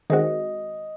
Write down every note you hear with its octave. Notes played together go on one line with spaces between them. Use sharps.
D#3 G#3 C4 F#4 D#5